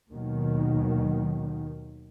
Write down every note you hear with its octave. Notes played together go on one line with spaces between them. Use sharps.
D#2 B2 D#3 F#3